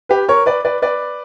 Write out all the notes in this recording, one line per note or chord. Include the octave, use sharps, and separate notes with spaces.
G4 B4
A#4 C#5
B4 D5
B4 D5
B4 D5